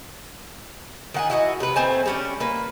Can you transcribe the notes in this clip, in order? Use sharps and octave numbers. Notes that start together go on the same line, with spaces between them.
D#3 F#5 G#5
E4 F#4 D#5
C3 B4
A3 C4 C5 G#5
G3 C#4 D4
A#3 B4